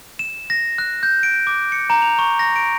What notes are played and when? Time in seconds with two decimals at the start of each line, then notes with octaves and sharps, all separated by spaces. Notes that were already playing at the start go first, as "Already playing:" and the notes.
0.19 E7
0.50 A#6
0.78 F#6
1.03 G6
1.23 D7
1.47 D6
1.72 C#7
1.90 A#5
2.02 F7
2.19 C#6
2.39 A#6
2.56 D7